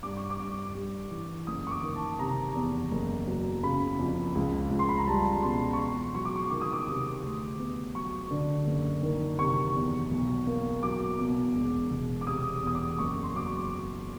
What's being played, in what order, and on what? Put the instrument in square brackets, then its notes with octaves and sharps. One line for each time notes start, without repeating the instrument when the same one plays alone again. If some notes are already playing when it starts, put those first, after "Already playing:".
[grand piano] G2 D6
C#6
D6
G2
G3
E3
F#1 D#6
C#6
D6
D#3
A5
C3 A#5
E2
F#1
F#3
C#3 B5
F2
C#2
C#2
C6
B5
A#5
G3 A5
B2 C6
C#6
E2 C6
F#3 C#6
D6
C#6
D#3 D6
D#6
D6
C3
D2
B3
F#3 C#6
D3
F#1
D#3
C3 C#6
E2
B1
A#3
F#3 D6
B2
E1
E1
D6
C3 D#6
E2 D#6
D6
F#1 C#6
C6
F#3 D6
C#6